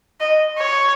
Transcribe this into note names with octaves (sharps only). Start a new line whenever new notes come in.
D#5
C#5